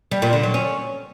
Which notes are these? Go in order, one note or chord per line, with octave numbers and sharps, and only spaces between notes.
G3
A#2
D3
F#3
C#4